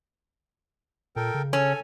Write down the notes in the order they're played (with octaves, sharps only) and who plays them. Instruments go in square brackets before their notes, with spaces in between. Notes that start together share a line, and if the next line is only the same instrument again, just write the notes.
[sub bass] A#2 [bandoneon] A4 A#4 G5
[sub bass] C#3
[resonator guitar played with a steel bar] C#4 [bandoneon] A4 G#5